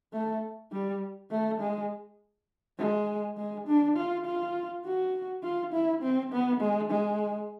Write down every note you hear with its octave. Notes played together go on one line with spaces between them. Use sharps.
A3
G3
A3
G#3
G#3
G#3
D4
F4
F4
F#4
F4
E4
C4
B3
G#3
G#3